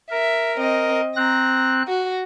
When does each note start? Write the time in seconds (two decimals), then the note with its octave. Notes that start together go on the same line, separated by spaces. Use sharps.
0.11 A#4 E5
0.57 C4 D#5
1.16 C4 A#5 F#6
1.88 F#4